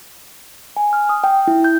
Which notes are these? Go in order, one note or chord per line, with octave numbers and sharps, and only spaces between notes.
G#5
F6
D#6
G5
E4
G6